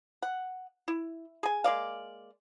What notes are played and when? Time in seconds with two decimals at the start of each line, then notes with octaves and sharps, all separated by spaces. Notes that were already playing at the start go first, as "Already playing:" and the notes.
0.22 F#5
0.88 E4
1.43 G#4 G#5
1.64 G#3 A#3 D5 F5